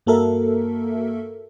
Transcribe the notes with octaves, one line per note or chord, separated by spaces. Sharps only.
G2 A#3 F#4 A4 A#4 E5